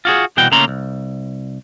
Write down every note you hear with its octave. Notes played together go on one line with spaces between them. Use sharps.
F4 F#4 G#4
C2 B2 E3 F#4 G5
C#3 A3 A#3 C#4 A#5 C6
C2